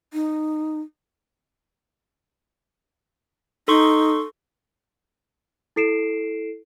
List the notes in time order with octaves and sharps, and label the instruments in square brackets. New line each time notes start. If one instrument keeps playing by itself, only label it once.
[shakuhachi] D#4
[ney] D#4 [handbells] A4 C6 C#6
[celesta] E4 A4 C7 D7 E7